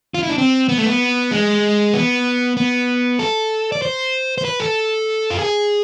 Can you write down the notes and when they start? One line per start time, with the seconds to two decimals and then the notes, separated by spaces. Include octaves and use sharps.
0.14 F4
0.23 E4
0.29 D4
0.38 C4
0.69 B3
0.78 A3
0.86 B3
1.31 G#3
1.94 B3
2.57 B3
3.19 A4
3.72 D5
3.82 C5
4.38 C5
4.45 B4
4.60 A4
5.30 F4
5.39 G#4